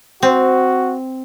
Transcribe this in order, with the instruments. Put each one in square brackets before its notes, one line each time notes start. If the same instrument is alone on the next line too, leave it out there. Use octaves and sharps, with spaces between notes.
[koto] C4 [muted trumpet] F#4